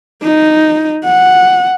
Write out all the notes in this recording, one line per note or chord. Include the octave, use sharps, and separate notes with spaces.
D#4
F#5